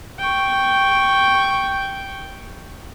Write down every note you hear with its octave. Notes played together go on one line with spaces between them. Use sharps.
G5 C#6